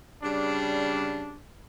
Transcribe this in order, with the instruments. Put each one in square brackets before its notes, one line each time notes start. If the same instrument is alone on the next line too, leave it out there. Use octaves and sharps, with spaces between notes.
[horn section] C#3 G3 D4